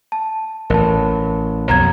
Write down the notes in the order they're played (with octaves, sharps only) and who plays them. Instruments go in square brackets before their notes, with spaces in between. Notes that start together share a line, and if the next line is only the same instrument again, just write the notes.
[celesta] A5
[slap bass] A1 [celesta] A#4 A5
[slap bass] B1 F2 B3 [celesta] A#5 G#6